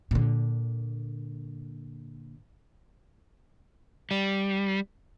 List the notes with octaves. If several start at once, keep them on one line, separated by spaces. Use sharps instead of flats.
A#2 D3
G3